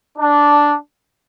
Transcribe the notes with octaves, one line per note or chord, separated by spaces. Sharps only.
D4